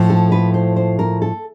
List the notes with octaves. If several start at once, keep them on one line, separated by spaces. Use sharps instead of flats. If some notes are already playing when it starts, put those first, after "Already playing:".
Already playing: A2 F3 A3
A4
B4
C5
C5
A#4
A4